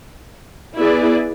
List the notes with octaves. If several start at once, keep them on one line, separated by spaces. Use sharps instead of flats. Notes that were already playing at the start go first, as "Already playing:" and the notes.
B3 E4 G#4 B4 D5